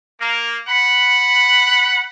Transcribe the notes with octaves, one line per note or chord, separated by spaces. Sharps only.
A#3
F#5 B5